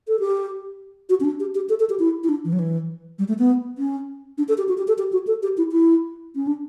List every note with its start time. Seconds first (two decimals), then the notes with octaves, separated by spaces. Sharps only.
0.08 A4
0.20 G4
1.09 F#4
1.20 C#4
1.24 D4
1.40 G4
1.55 G4
1.69 A4
1.80 A4
1.90 G4
1.99 E4
2.24 E4
2.29 D4
2.45 E3
2.52 F#3
2.59 E3
3.19 G3
3.28 A3
3.39 B3
3.78 C#4
4.38 D4
4.48 A4
4.58 G4
4.68 F#4
4.78 G4
4.88 A4
4.98 G4
5.12 F#4
5.27 A4
5.43 G4
5.58 E4
5.72 E4
6.35 C#4
6.47 D4